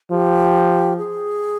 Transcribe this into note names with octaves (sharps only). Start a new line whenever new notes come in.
F3 G4
G#4